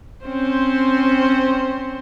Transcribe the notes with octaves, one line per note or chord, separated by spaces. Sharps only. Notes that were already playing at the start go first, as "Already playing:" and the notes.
C4 C#4 C5